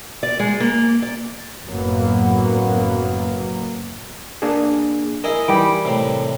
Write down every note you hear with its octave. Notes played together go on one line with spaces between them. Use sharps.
D5
G#3
A#3
D5
F#1 F#2 A2 F#3 A#3 B3
A#3 D4 G#4
E4 G#4 A#4 D#5
E3 G3 G4 B5 D6
A2 C3